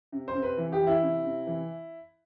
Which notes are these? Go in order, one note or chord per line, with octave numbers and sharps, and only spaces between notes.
C3
C5
C3
B4
E3
G4
E3
E4
C3
C3
E3